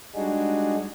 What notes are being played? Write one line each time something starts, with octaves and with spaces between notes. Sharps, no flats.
G3 G#3 D4 D#4 F#4 G#4